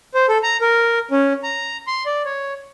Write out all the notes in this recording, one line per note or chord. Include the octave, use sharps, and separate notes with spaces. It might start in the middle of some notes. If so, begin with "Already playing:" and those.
C5
A4
A#5
A#4
C#4
A#5
C6
D5
C#5